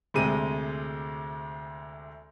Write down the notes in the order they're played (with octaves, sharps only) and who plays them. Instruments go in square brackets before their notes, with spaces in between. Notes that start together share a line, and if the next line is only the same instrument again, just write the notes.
[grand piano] D2 C3 G#3 D#7